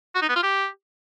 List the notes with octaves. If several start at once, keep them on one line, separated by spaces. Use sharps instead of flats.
F#4
D#4
B3
F4
G4